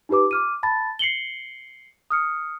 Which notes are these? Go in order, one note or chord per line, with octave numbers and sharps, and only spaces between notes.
D#4 F4 G4 B4 D6
D6 F6 D#7
A5 B5 A6
C7 C#7 F#7 G7
D#6 F6 C#7